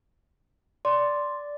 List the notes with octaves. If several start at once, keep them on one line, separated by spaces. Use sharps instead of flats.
D5 C6